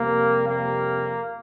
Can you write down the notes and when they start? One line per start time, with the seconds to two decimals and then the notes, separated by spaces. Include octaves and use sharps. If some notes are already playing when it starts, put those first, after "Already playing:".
Already playing: F2 C3 G3 A#3
0.48 A#3